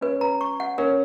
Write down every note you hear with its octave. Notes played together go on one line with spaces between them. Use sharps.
C#4 B4
A#5
C#6
F#5
C#4 A#4